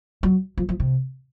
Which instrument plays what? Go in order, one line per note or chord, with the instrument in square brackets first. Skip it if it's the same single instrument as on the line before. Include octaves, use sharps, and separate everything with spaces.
[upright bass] F#3
F3
F3
C3